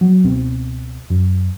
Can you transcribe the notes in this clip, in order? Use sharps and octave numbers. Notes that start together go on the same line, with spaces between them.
F#3
C#2 B2 C4
F#2